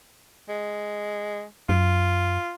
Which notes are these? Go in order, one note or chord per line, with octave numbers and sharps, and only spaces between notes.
G#3
F#2 F4